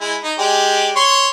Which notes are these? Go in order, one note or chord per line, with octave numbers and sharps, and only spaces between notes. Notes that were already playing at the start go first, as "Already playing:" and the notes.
G#3 E4
D#4
G#3 G4 D5
C#5 C6 C#6